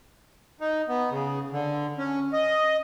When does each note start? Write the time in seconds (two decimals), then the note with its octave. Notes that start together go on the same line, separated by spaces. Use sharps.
0.60 D#4
0.88 B3
1.11 C#3
1.52 D3
1.98 C#4
2.33 D#5